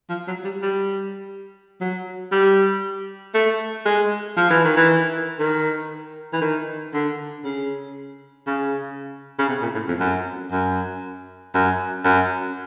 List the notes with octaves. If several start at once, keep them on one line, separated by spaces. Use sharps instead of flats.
F3
F#3
G3
G3
F#3
G3
A3
G#3
F3
E3
D#3
E3
D#3
E3
D#3
D3
C#3
C#3
C#3
C3
A#2
A2
F2
F#2
F#2
F#2
F#2